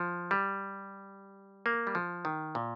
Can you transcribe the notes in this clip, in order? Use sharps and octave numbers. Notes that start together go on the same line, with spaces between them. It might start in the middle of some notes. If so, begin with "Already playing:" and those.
Already playing: F3
G3
A#3
G3
F3
D#3
A#2